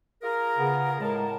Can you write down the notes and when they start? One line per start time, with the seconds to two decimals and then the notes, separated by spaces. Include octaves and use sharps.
0.22 F4 G#4 A#4
0.59 C#3 B3
1.01 A2 G#3 A#4 A5